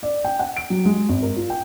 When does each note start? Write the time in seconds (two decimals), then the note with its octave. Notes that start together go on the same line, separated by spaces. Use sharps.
0.03 D5
0.25 G5
0.39 F#5
0.57 D7
0.70 F#3
0.85 G#3
1.09 G#1
1.23 A#4
1.36 F4
1.50 G5